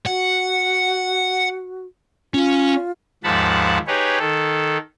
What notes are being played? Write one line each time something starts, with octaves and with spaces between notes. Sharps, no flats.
F#4 F#5
C#4 F4
D#2 G#2 F3 F#5 A5 B5
D#4 G4 G#4 B4 C#5
D#3 A4